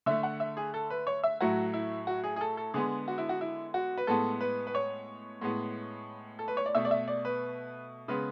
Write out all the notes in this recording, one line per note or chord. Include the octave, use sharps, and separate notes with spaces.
D3 A3 E5
F#5
E5
G#4
A4
B4
C#5
E5
A2 F#3 A3 F#4
E4
F#4
G#4
G#4
A4
A4
D3 G#3 B3 G#4
F#4
E4
F#4
E4
F#4
B4
A2 G#3 B3 A4
B4
B4
C#5
A2 G#3 B3
A4
B4
C#5
D5
B2 A3 E5
D5
E5
D5
B4
C#3 G#3 B3 B4